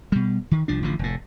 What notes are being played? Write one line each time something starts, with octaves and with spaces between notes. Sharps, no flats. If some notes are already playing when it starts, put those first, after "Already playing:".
B2 G3
D#3
C2 F3 D4
A1 D3 F3
F1 A2